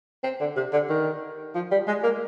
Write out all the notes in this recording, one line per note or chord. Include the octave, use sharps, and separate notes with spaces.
C4
D3
C3
D3
D#3
F3
G3
G#3
A#3